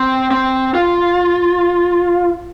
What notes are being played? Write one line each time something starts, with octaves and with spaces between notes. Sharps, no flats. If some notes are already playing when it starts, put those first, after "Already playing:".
Already playing: C4
C4
F4